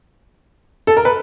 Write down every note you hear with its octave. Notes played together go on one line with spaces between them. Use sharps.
A4
A#4
B4